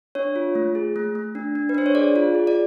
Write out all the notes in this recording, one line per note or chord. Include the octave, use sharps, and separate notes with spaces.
D4 C#5
F4
A3
G#4
A3
A3
D4
D4
B4
D4 C5
C#5
G#4 D5
F4
G#4
D5